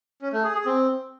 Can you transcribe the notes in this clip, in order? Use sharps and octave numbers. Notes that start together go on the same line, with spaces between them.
C#4
A3
G#4
G#4
C4